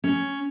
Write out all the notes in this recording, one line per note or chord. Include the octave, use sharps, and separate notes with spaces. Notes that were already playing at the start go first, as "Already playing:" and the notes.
C#4